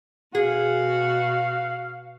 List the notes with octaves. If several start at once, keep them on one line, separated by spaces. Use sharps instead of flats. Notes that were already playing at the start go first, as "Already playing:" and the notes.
B2 F#4 G#4 F5